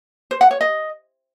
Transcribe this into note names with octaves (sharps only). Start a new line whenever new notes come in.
C5
F#5
C#5
D#5